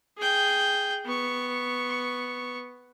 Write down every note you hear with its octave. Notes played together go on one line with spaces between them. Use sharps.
G#4 G5
B3 C#6